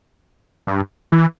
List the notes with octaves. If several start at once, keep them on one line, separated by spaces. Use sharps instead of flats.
G2
E3